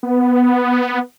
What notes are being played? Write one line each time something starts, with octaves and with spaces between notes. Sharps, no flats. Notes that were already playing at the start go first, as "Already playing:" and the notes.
B3